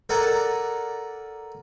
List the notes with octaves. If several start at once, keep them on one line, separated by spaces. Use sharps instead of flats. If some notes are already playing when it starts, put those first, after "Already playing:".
A4 A#4 D5 F#5 G#5 A#5